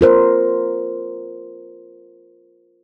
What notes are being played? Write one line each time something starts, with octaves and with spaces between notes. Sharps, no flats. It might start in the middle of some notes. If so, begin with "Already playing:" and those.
F4 A#4 C5